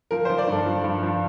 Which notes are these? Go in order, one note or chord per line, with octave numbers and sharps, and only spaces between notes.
F3 A#4
F3 C5
D5
G2 A4
F3
G2
F3